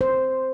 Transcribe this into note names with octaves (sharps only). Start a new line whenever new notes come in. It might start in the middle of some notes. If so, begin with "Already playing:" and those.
C5